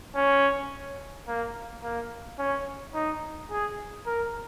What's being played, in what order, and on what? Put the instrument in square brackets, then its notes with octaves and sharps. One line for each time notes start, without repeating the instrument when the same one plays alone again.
[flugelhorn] C#4
A#3
A#3
C#4
D#4
G#4
A#4